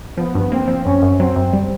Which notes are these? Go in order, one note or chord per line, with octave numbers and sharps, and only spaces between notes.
F3 B3
G2
A#3 C4
F3
F#2 C#4
F#2
F#3 C4
F#2
G3